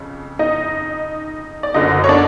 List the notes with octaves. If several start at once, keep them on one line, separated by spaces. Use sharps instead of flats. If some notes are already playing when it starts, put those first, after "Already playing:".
Already playing: F2 C#3
D#4 D#5
D5
F#1 F#2 D3 D#4 D#5
C#5
D4 D5